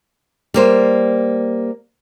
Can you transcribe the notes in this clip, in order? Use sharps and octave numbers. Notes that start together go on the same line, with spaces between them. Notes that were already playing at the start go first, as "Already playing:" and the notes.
G3 A#3 C5